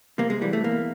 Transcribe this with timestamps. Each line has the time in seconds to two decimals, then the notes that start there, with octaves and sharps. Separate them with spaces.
0.18 C3 A#3
0.30 G#3
0.41 E3 G3
0.53 A3
0.64 E2 A#3